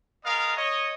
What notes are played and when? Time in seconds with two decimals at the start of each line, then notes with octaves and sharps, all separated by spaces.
0.24 G#3 B3 A#4 D#5 F5 D#6
0.57 C#5 D#5